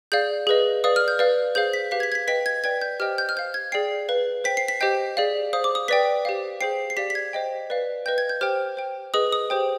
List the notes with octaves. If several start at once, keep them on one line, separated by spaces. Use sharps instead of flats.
G#4 D5 F5 G6
G#4 B4 D#5
B4 D5 F5 D#6
F6
G6
B4 D5 F5
G#4 C5 F5 G6
B6
G4 B4 F5 B6
G#6
B6
G#6
B6
B4 D#5 G5 B6
G#6
B4 D5 G5 G#6
G6
G4 C5 D#5 G5 F6
G6
F6
C5 F5 G6
G#6
G#4 D5 G5 C7
B4 F5
C5 G5 B6
C7
B6
G4 C5 D#5 G5 G6
G#4 D5 F5
C5 F5 D#6
D6
D#6
B4 D5 G5 B6
G4 C5 F5
G#4 C5 G5 C7
C7
G4 D5 F5 B6
B6
G#6
C5 D#5 G5
B4 D5 F5
B4 D#5 G5 G6
G#6
G6
G4 C5 G5 F6
C5 G5
G#4 B4 D#5 D#6
D#6
G4 C5 G5